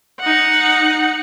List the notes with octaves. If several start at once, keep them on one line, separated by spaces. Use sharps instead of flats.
D#4 F#5